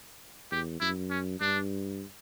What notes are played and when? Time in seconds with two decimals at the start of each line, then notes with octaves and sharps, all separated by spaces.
0.51 E2 G4
0.81 F#2 E4
1.10 C#4
1.41 G2 D4